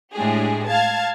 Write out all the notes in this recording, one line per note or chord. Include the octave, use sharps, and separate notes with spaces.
A2 G#3 D4 G4 G#4
F5 A5 G#6